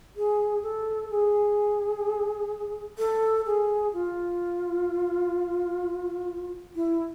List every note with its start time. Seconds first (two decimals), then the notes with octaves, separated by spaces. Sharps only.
0.16 G#4
0.63 A4
1.10 G#4
2.99 A4
3.46 G#4
3.94 F4
6.76 E4